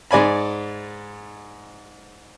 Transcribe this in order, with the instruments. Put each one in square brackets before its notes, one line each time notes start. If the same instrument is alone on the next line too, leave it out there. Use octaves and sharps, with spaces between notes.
[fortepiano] G#2 D5 G#5 B5